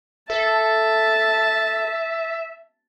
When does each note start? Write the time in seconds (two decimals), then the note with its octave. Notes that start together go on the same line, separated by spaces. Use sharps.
0.30 A4 E5 A5